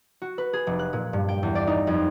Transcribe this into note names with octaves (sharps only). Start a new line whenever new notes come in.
F#4
B4
G#4
F1
F#6
A#2
G2
G5
E2
D5
D#4
F2